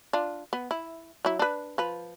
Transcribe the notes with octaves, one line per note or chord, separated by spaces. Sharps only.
D4 F4
B3
E4
F#3 E4
D4 B4
F3 B4